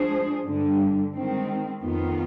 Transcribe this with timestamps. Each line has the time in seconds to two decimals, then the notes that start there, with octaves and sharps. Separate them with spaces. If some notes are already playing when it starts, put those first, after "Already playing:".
Already playing: F3 G#3 D4 G#4 C5
0.44 G2 D3 G3
1.14 D#3 G#3 C4
1.83 F2 D#3 B3 F4